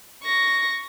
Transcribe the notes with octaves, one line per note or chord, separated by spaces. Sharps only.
C#6 A#6